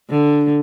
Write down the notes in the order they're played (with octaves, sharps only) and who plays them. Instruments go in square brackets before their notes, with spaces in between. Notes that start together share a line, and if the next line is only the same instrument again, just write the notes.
[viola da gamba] D3